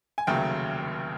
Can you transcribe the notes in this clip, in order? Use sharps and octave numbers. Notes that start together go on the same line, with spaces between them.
G#5
F1 D#2 C#3 F#3 A3 G5